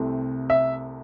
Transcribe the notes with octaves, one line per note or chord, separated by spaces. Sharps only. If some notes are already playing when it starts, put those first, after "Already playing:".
Already playing: C2 C3 A3 C4
E5